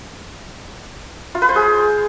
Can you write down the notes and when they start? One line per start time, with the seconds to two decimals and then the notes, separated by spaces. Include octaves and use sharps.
1.35 F4
1.42 B4
1.49 C5
1.56 G#4